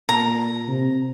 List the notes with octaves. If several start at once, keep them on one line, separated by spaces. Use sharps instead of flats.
A#2 A#5
C3